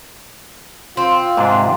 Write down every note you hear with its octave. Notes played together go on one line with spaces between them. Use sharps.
C4 F4
G#2 C3 D4